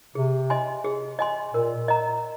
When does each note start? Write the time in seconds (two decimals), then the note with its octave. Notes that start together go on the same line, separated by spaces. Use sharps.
0.15 C3 G#4
0.50 D#5 G#5 C6
0.84 G#4
1.19 D#5 G#5 C6
1.54 A#2 A#4
1.88 D#5 A#5